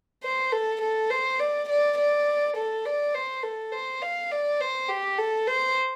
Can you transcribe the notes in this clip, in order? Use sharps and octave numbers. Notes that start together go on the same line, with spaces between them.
C5
A4
A4
C5
D5
D5
D5
A4
D5
C5
A4
C5
F5
D5
C5
G4
A4
C5